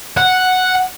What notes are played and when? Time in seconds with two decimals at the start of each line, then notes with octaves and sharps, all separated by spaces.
0.18 F#5